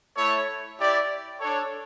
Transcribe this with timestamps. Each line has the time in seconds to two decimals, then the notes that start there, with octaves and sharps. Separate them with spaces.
0.17 A3 E4 A4 C#5
0.78 E4 G4 D5
1.40 D4 A4 C#5